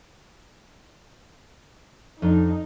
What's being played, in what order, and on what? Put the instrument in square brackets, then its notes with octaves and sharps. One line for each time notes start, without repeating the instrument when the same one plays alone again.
[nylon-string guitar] F2 D4 [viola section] D#4